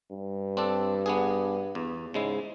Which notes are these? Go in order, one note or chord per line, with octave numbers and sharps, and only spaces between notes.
G2
C4 D4 A4
B3 D4 G#4
E2
G#2 C#3 G#3 E4